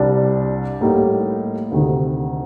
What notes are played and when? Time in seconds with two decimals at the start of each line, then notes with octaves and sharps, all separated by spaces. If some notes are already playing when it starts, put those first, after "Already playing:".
Already playing: C2 C3 G3 D4
0.81 A2 G3 A#3 D#4
1.72 D2 C3 D#3